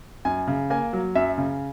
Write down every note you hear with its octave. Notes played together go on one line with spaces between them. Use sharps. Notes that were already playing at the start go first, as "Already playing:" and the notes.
F#2 G#5
C#3
A#3 G#5
F#3
F#2 E5
C#3